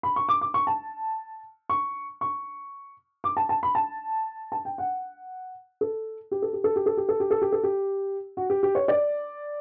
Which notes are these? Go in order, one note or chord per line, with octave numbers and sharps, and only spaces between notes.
B5
C#6
D6
D6
C#6
A5
C#6
C#6
D6
A5
A5
B5
A5
A5
G5
F#5
A4
G4
A4
G4
A4
G4
A4
G4
A4
G4
A4
G4
A4
G4
F#4
G4
G4
C#5
D5